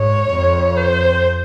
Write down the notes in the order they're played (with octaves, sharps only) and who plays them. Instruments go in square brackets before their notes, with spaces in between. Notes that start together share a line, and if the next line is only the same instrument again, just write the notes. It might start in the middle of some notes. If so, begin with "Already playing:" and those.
Already playing: [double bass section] G#2 [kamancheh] C#5
[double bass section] F2
[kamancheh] C5